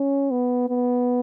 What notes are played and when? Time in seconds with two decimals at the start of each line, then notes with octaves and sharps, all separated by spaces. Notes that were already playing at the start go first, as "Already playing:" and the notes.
Already playing: C#4
0.31 B3
0.69 B3